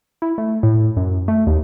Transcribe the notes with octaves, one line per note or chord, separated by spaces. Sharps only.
E4
A3
A2
F#2
A3
D#2